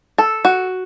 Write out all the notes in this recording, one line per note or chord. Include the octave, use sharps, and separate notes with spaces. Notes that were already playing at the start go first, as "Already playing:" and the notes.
A4
F#4